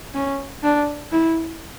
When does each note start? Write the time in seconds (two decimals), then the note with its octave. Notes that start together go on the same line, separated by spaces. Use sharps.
0.14 C#4
0.63 D4
1.12 E4